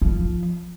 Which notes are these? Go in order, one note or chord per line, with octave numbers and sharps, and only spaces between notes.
F3